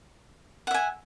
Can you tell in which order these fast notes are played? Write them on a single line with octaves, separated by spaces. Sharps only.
F#5 E5 G#5